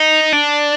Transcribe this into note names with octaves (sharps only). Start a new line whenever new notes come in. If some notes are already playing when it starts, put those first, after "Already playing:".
Already playing: D#4
D4